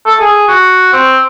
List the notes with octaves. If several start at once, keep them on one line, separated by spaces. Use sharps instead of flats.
A4
G#4
F#4
C4